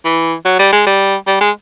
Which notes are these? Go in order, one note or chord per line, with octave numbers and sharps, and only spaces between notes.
E3
F#3
G3
G#3
G3
G3
G#3